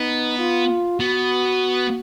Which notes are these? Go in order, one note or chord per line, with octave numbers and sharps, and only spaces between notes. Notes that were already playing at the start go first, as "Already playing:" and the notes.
Already playing: B3 D#4
F4
B3 F#4